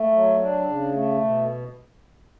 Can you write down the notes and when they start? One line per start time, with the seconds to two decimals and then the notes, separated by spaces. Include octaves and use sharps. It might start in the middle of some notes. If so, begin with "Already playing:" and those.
Already playing: A3
0.13 F#3
0.40 D4
0.67 C#3
0.93 A3
1.20 B2